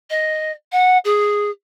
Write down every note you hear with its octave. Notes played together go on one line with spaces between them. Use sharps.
D#5
F#5
G#4